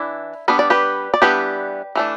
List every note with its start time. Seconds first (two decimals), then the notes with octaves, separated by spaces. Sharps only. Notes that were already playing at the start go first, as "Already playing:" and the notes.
Already playing: E3 D4 E4
0.48 G3 B3 D4 B4
0.59 D5
0.70 G4 B4
1.14 D5
1.22 E3 G3 B3 D4 G4 B4
1.95 E3 A3 D4